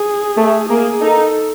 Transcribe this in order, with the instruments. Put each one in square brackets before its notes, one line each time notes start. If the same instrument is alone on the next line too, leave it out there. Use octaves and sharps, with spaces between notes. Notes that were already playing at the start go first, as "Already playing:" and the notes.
Already playing: [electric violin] G#4
[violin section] A3
[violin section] A#3 [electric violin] G#4
[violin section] D#4 [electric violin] A4